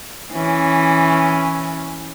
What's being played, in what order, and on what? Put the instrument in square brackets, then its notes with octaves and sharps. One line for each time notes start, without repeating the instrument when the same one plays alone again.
[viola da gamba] E3 C#4